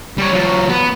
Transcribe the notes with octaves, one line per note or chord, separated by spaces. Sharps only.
G3 C#5
F#3 F4
B3